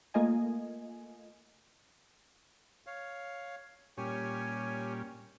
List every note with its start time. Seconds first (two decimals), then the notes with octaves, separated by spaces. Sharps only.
0.14 A3 A#3 F4 D#5 G#5
2.86 C#5 F5
3.98 A#2 G3 C#4 G4 C#5 G#5